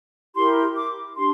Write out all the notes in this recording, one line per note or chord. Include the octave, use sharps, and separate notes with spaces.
E4 G4 A#4 C6
D6
D4 G4 C6